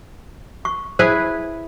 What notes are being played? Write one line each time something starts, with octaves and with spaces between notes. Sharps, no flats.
C#6
E4 G#4 B4 C5